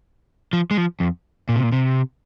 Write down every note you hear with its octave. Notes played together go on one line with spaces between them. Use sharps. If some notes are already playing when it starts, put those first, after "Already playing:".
F3
G#3
F3
F2
A#2
C3
A#2
C3